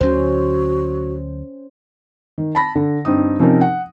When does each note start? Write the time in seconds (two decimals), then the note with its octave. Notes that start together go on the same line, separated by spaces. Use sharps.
0.01 D2 D3 F#3 C#4 F#4 C5
2.38 D#3
2.55 A5 B5 A#6
2.75 D3
3.05 G2 C4 D#4 D#6
3.39 C3 F3 C4 C#4 D#4 A#4
3.61 F#5